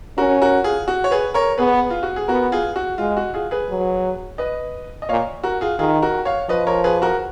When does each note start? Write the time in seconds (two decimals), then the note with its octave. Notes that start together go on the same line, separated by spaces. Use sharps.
0.18 C#4 F#4 A#4
0.42 F#4 A#4
0.64 F4 G#4
0.88 F#4
1.04 C#5
1.11 G#4 B4
1.34 A#4 C#5
1.58 B3 G#4 B4
1.90 F4
2.03 F#4
2.16 G#4
2.28 B3 F#4 A#4
2.52 F4 G#4
2.76 F#4
2.98 G#3 F4
3.17 F#4
3.34 F4 G#4
3.51 G#4 B4
3.69 F#3
4.38 B4 D#5
5.02 D#5
5.09 A#2 C#5 F5
5.44 F#4 A#4
5.61 F4 G#4
5.79 D#3 F4 G#4
6.02 F#4 A#4
6.25 C#5 F5
6.49 F3 B4 D#5
6.67 A#4 C#5
6.84 G#4 B4
7.02 F#4 A#4